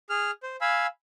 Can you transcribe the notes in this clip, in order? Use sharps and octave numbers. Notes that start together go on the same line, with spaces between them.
G#4 F6
C5
F5 G#5 B5 E6